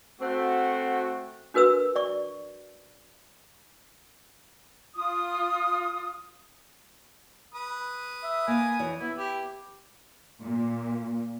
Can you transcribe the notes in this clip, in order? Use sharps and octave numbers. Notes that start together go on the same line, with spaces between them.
A3 C4 F#4
D4 F#4 A#4 B4 E6
D5 C#6
F4 D#6
B4 D#6
E5
A#3 F5 G#5
F2 E3 C#5
B3 E4
E4 G4
A#2